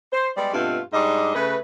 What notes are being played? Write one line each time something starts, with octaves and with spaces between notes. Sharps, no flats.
C5
G3 G#3 B3 D5
G2 B2 A3 C4 F4
G#2 G3 D4 D#5
C#3 A3 B4